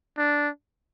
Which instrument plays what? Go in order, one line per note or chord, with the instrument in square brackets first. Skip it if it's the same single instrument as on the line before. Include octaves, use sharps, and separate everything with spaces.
[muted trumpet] D4